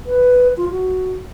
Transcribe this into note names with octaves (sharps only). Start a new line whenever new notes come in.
B4
F4
F#4